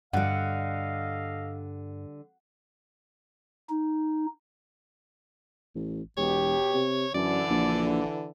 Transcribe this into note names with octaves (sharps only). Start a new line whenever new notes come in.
G2 D3 G3 A4 D#5 F5 F#5
D#4
A1
E1 B2 G4 C#5
C3
F#2 D3 E3 D5
A#1